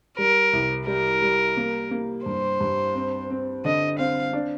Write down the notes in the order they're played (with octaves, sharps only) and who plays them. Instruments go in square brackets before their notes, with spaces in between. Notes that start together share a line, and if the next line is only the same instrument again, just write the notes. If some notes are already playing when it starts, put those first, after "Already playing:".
[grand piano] G3 [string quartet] A#4
[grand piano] C2
[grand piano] G3 [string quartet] A#4
[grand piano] G3
A#3
A#3
[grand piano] G2 [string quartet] C5
[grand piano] G2
C4
C4
[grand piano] D3 [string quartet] D#5
[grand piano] C4 [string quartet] F5
[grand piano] D4